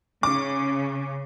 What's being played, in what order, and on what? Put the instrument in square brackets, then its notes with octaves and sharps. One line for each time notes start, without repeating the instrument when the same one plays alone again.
[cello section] C#3 C#4 [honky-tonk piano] D6